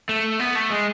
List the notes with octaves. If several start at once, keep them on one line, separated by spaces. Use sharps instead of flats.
A3
B3
A3
G#3